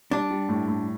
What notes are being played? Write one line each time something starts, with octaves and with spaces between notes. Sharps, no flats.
G3 D4
G3
A2
A2